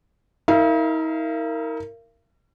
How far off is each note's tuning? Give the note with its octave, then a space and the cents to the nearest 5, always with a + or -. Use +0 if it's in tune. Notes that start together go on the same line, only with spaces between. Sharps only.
D#4 +45 A#4 -15 F5 -45